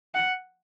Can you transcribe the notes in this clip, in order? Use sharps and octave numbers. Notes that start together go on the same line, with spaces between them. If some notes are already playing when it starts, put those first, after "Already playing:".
F#5